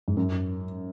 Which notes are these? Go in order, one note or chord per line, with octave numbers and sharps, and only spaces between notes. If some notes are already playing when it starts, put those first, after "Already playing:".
G#2
F#2